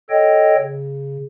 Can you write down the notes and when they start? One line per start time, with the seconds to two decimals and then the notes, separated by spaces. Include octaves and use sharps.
0.10 A4 C#5 D#5 G5
0.57 C#3